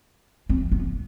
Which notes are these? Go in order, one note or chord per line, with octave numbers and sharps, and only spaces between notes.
C4
B3